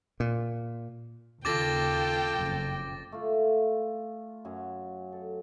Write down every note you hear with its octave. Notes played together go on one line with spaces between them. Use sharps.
A#2
D#2 C#3 F4 A4 G5 D6 A6 A#6
F#1 F2 C#3
A3 F4
F#2 G#5
A4